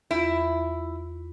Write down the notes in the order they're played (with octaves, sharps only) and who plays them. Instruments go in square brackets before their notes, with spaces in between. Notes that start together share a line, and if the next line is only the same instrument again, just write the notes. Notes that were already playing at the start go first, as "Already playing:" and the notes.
[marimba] E2 F4 [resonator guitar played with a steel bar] E4